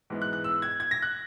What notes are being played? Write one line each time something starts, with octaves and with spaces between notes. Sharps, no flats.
G#2 E3 G#3 B3
F#6
F#6
E6
G#6
G#6
A#6
F#6